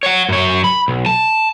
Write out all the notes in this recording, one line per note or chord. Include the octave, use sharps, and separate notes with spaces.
C#5 F#5
F#2 C#5
B5
B1
A5